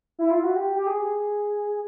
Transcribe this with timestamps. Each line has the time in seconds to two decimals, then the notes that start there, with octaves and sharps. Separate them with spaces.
0.19 E4
0.31 F4
0.43 F#4
0.56 G4
0.76 G4
0.87 G#4